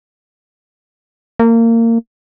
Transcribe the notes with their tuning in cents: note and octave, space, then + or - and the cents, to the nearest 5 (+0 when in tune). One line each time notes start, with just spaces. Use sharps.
A#3 -25